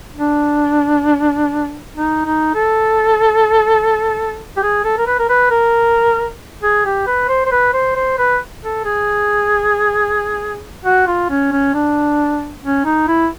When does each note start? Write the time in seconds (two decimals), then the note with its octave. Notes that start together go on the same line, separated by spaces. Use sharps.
0.16 D4
1.95 D#4
2.25 D#4
2.54 A4
4.57 G4
4.63 G#4
4.84 A4
4.98 A#4
5.07 B4
5.19 A#4
5.29 B4
5.50 A#4
6.63 G#4
6.85 G4
7.06 B4
7.28 C5
7.46 C5
7.51 B4
7.73 C5
7.96 C5
8.18 B4
8.63 A4
8.84 G#4
10.85 F#4
11.07 F4
11.30 C#4
11.52 C#4
11.74 D4
12.62 C#4
12.85 D#4
13.08 E4